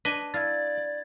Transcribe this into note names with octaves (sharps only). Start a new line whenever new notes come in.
D4 B4 D#5 G#5
E4 D5 F5 G#6 A6